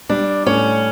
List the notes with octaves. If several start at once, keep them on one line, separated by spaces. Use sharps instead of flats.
G3 D4
A2 C#4